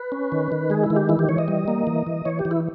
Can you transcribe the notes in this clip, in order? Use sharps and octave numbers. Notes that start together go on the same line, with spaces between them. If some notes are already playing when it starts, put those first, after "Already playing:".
Already playing: B4
C#4
D#3
D#3
G#3 G#4
E4
D#3
G4
E3 E4
G4
E3 C#5
D#5
G3
A#3
E3
E3
E3 C#5
G4
E3
E4